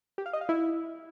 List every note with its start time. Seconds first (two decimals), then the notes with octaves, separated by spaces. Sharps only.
0.18 G4
0.26 F5
0.33 D#5
0.41 F5
0.49 E4